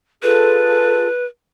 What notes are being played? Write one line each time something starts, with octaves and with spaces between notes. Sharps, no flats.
F4 G#4 A4 B4